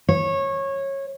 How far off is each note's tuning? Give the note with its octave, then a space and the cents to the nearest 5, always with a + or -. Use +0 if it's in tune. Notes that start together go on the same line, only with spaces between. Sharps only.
C#5 -20